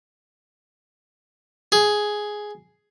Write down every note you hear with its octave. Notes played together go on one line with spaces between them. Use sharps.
G#4